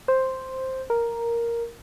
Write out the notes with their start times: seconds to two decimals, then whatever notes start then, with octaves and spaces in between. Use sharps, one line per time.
0.08 C5
0.90 A#4